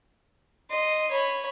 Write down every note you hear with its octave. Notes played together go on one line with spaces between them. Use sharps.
D#5 C6
C#5 B5